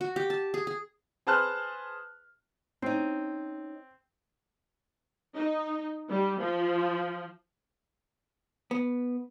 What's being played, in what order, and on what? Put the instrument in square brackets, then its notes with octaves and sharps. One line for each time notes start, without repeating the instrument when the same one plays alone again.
[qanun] F#4
G4
A5
G#4
G#4
[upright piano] G#4 B4 C5 A5 F6 F#6
[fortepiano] C4 [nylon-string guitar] C#4 D#4
[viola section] D#4
G3
F3
[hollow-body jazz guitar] B3